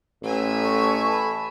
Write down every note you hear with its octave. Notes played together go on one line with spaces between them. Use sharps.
A1 E5 G#5
A4 C#6
B5